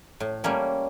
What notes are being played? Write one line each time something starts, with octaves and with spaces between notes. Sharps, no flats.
A2
G3 A3 A#3 C#4